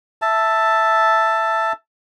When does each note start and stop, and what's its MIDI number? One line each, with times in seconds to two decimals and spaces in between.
0.22 1.73 76
0.22 1.73 81